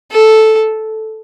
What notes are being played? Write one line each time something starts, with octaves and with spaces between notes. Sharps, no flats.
A4